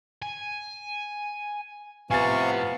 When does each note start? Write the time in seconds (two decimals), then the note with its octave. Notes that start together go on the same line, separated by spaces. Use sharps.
0.22 G#5
2.11 A2 C3 F3 B3 F5 G#5 C#6 A6